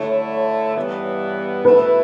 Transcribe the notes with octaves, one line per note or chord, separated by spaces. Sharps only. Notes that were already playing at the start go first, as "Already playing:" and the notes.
Already playing: D3 A3 E4 C#5
G2 E3 B3
B2 A3 E4 B4